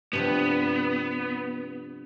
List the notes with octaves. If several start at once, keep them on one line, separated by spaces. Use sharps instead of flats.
G2 C3 F3 B3